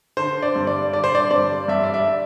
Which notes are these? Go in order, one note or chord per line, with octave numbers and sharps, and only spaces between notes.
D3 C5
D5
G2
D5
D3 D5
C5
D5
G2 D5
G2 E5
D5
E5